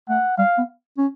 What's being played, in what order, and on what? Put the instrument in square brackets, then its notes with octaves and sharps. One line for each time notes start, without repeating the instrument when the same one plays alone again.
[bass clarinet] A3 [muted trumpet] F#5
[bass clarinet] G3 [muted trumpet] F5
[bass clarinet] B3
C#4